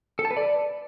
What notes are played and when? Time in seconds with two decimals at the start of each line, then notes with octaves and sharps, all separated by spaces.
0.19 A4
0.25 A5
0.31 B4
0.37 D5